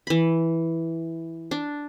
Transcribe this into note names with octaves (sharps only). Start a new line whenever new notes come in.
E3 B5
D4